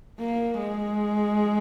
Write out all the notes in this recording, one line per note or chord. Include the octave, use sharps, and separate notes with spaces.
A#3
G#3